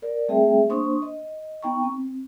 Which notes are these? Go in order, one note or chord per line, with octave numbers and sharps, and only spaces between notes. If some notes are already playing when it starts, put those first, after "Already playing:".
A#4 D5
G3 A3 C4 G#4 E5 G5
A#3 D4 C5 C6 C#6 D#6
D#5
B3 D#4 G5 A#5 C#6
C4